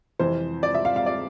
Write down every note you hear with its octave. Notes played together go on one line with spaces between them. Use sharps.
F2 C3 E3 C5
D5
E5
F5
F5
D5